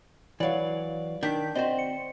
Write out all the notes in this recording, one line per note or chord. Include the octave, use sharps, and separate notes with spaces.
E3 F#3 D5 F5
D#3 D4 G6 B6
C4 F#4 C5 D5 D#5
C#7